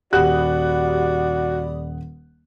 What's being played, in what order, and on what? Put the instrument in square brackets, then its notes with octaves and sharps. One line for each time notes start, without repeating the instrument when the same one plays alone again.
[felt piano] D#1 F#5 F#6 [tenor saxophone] F#4 [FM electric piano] G4 B5 D#6 [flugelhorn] D5